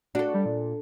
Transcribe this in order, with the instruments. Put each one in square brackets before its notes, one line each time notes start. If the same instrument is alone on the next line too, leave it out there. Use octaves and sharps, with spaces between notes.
[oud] D4 A4 [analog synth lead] F#4
[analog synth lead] G3
A#2